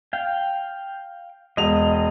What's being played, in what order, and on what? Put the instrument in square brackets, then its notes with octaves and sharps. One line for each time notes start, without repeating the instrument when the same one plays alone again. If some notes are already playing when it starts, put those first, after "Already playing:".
[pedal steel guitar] F5 G5
[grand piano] E1 F7 [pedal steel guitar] D#5